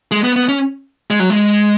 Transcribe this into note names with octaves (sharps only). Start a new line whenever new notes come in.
G#3
B3
B3
C#4
G#3
F#3
G#3